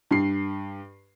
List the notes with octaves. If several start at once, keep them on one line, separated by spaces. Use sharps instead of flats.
G2 C7